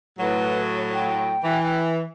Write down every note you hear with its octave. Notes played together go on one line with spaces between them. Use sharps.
A2 F#3 B4
C#5
G5
E3